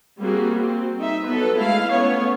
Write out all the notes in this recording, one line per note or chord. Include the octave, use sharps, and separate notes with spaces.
G3 A#3 C4 F#4 G#4
C4
D#4 E5
F#3 B3 A4 B4
G#3 A3 E4 F5
A3 B3 C#4 C#5